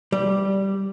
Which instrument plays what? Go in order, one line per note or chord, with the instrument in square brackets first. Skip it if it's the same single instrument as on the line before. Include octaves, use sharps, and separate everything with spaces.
[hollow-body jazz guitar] G3